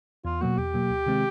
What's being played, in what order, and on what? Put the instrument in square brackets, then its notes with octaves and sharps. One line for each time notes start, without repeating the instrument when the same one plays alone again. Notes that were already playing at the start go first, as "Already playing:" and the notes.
[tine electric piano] E2 [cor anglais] F4
[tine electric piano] B2 F#3 A#3 [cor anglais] F#4
[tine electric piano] E2 [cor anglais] G4
[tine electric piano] B2 F#3 A#3
D2
C3 D#3 G#3 C4